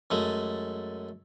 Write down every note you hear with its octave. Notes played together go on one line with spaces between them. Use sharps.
F#2 G#3 A3